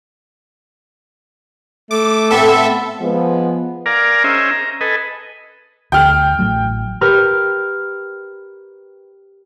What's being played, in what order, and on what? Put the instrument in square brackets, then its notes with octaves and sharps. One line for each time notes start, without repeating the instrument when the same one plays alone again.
[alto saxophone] A3 [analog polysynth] D6
[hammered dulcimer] A2 B3 C4 [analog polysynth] A4 E5
[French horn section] F3 G#3 B3
[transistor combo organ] A#4 D5 F5 G#5 A#5
C#4 G#4 C5 D#5 E5
A#5
A4 B4 D#5 G#5
[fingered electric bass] D2 [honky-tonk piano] G5 F6
[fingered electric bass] A1 F#3 A3
[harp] G4 A#4 B4 F6